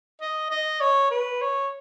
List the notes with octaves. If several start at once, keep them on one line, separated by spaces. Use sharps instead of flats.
D#5
D#5
C#5
B4
C#5